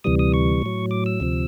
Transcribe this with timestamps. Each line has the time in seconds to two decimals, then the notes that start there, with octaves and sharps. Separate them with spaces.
0.04 D2 C3 E3 G3 D#6
0.19 D#6
0.34 C#6
0.62 A2 F#3
0.91 D6
1.06 E6
1.20 D2 C3 F3